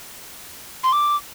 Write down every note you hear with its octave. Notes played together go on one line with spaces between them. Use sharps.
C6
D6